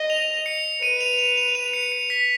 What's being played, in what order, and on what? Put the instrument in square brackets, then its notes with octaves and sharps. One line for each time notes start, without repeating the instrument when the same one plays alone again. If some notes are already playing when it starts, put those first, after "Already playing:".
Already playing: [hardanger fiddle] D#5
[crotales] F7
C#7
[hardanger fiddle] B4 [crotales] D#7
[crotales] F7
F7
F7
F7
C#7
C#7
B6